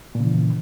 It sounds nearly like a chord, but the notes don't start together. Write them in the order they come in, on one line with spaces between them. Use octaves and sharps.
A#2 C#3 E3